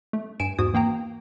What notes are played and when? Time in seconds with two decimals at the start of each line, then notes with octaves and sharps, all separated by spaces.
0.13 A3
0.40 G2 G#5 D7 E7
0.59 E2 G#2 F#4 D#6 G#6
0.74 E3 A#3 G5 A#5